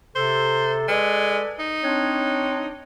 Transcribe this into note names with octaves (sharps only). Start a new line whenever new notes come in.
C3 A4 C5
G#3 A4 B4 D5
D#4
C4 D4 C#5